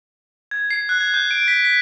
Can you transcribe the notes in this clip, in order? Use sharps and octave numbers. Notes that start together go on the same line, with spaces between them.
G#6
C7
F#6
G#6
G6
D7
B6
B6